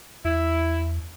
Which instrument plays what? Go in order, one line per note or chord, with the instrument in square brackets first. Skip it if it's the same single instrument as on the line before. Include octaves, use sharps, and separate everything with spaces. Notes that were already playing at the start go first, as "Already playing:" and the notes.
[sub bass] E2 [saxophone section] E4